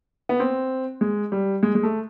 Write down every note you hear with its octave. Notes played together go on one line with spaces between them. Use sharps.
B3
C4
G#3
G3
G#3
G#3
A3